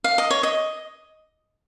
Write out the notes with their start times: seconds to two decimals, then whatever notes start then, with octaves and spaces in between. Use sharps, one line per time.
0.04 F5
0.18 D#5
0.30 C#5
0.43 D#5